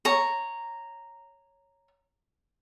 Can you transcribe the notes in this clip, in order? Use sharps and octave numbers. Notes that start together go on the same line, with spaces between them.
C#5 A#5